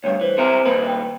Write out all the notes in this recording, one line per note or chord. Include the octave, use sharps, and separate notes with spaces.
D2 G2 C#5
E3 C5
C3 E4 A#4
D#2 A#2 B4
G5